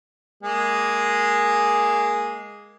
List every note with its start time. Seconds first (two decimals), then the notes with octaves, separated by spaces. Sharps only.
0.43 G#3 A#3 G#4